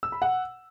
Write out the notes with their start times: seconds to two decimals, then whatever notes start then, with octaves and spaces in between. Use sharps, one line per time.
0.03 E6
0.12 B5
0.22 F#5